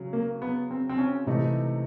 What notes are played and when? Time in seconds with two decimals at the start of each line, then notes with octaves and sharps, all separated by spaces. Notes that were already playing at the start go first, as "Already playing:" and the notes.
Already playing: C#3 F#3
0.13 A#3
0.42 B3
0.71 C4
0.89 C4
0.98 C#4
1.27 C3 E3 A3 D#4